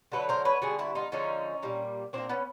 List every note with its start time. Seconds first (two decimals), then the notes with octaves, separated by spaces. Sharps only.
0.12 D3 F#3 A3 A4 B4
0.29 A#4 C5
0.45 B4 C#5
0.62 D3 G3 B3 F#4 G#4
0.79 E4 F#4
0.95 D#4 F4
1.12 D3 F3 G#3 C#4 D#4
1.62 A#2 G3 A#3
2.13 A#2 F#3 C4 D4
2.18 A#3
2.29 B3 C#4